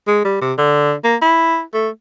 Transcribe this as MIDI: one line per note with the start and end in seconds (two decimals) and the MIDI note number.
0.07 0.24 56
0.25 0.39 55
0.41 0.53 48
0.58 0.94 50
1.04 1.16 58
1.22 1.62 64
1.74 1.89 57